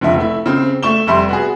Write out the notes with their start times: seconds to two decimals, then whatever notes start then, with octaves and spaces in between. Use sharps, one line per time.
0.01 F1 C#2 D3 F3 E5
0.18 A3 E4
0.46 C#3 C4
0.83 A3 C#6 E7 G7
1.07 F1 G3 E5 C6
1.29 B3 F#4 G#4